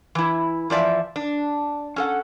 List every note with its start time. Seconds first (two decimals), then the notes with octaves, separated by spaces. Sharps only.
0.15 E3 E4
0.70 E3 F3 D5 E5
1.16 D4
1.96 C#4 A4 F#5